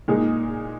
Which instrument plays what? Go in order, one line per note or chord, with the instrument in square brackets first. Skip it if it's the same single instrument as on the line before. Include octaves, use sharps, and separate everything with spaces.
[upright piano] A#2 G#3 D#4 G#4